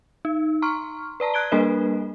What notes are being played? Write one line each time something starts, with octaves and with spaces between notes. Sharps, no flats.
D#4
A#5 C6 C#6 F6
B4 D5 A5 A#5
F#6 G#6 D7 G7
G3 A#3 D4 A#4 B4 D#5